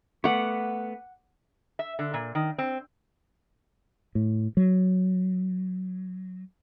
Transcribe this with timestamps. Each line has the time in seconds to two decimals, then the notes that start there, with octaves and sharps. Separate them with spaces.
0.24 A3 B3 F#5 D6
1.79 E5
1.99 D3
2.14 A#2
2.35 D#3
2.58 C4
4.15 A2
4.57 F#3